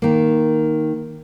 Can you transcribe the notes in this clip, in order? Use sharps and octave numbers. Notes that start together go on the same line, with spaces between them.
D#3 A#3